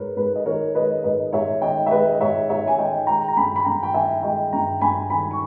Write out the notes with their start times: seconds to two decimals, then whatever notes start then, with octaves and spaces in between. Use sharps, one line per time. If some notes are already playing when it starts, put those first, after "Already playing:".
Already playing: G#2 G#3 A#4 B4 C#5
0.17 G#2 B4
0.35 D#5
0.46 D#3 A#4 C#5
0.75 G#3 B4 D#5
1.04 G#2 B4 D#5
1.33 G#2 C#5 E5
1.62 D#3 D#5 G5
1.86 E5
1.91 G#3 B4 D#5
2.10 D#5
2.20 G#2 C#5 E5
2.49 G#2 C#5 E5
2.68 G#5
2.78 D#3 D#5 G5
3.07 G#3 G5 A#5
3.28 A#5
3.36 G2 G#5 B5
3.56 B5
3.65 G2 G5 A#5
3.83 G5
3.94 D#3 E5 G#5
4.23 G#3 D#5 G5
4.53 G2 G5 A#5
4.81 G2 G#5 B5
5.10 D#3 G#5 B5
5.31 C#6